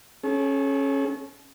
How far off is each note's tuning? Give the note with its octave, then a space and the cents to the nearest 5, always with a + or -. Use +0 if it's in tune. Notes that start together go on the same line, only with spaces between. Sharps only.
C#4 -15 A4 -45